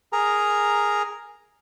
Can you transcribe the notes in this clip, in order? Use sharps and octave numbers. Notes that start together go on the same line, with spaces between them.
G#4 A#4 A#5